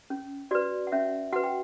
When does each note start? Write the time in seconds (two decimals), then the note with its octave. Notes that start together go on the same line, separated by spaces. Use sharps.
0.10 C#4
0.51 F#4 B4 D5
0.87 F#5
0.92 C#4 E5
1.33 F#4 B4 F#5
1.44 G5